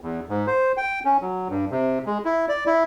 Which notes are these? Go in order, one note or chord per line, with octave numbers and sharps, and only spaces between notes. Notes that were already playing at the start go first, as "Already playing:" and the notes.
E2
G#2
C5
G5
C#4
F#3
G2
C3
G#3
E4
D5
E4